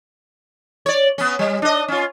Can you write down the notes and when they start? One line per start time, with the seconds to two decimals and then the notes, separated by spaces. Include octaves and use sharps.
0.86 C#5 D5
1.18 B3 C#4
1.39 G3
1.62 D4 D#5
1.88 C#4 F4